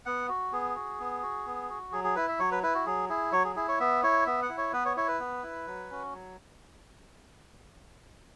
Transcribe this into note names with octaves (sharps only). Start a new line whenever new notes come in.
B3 F#5
F#4
B3 G#4
F#4
B3
F#4
B3
F#4
F#3 G#4
G#4
E4 B4
E5
F#3 C#5
B4
E4 B4
F#4
F#3 G#4
E4 G#4
F#3 C#5
G#4
E4 G#4
C#5
B3 E5
E4 C#5
B3 E5
F#5
E4
C#5
B3 B4
C#5
E4 C#5
B4
B3
E4
F#3
C#4 F#4
F#3